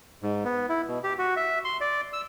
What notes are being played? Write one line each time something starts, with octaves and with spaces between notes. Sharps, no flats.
G#2
B3
E4
B2
G4
F#4
E5
C6
D5
E6